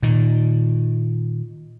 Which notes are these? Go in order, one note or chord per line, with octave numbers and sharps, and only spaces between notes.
A#2 D#3